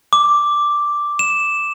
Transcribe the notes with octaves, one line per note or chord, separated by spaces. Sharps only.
D6
E7